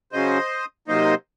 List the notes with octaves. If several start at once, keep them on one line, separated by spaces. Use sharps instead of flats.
C#3 F#3 C#4 C5 D#5
C3 F#3 A#3 D#4 C5 D#5